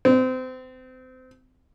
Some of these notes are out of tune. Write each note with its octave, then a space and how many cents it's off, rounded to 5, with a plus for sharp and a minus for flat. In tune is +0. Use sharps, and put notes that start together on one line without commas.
C4 -30